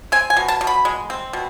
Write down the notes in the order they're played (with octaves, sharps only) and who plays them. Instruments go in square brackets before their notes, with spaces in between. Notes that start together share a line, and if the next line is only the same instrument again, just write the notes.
[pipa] C4 G#5
G#5
B2
A5
B2
B5
G#3
C4
B2